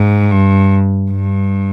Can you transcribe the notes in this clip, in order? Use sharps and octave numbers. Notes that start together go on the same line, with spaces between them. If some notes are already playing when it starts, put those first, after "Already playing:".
Already playing: G#2
G2
G2